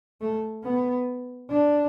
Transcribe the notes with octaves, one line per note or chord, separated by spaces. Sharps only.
A3
B3
D4